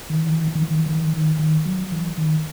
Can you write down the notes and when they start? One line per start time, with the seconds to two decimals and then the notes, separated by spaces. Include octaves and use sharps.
0.10 D#3
0.17 E3
0.25 D#3
0.32 E3
0.40 D#3
0.48 E3
0.55 D#3
0.63 E3
0.71 D#3
0.79 E3
0.86 D#3
0.94 E3
1.01 D#3
1.13 D#3
1.39 D#3
1.65 F#3
1.92 E3
2.17 D#3